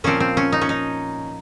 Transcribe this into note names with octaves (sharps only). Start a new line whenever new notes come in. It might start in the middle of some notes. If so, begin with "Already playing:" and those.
A#2 F3 C4 C#4
C4
C#4
D#4
C#4
D#4